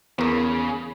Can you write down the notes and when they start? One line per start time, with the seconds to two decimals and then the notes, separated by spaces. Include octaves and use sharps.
0.19 E2 C#3 B3 A#4